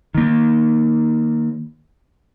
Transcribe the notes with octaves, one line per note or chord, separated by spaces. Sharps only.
D#3 A#3